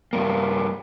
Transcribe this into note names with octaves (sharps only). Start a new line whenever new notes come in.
G2 A#3